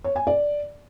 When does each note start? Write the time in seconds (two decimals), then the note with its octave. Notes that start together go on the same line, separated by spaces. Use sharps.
0.04 C#5
0.16 G#5
0.27 D5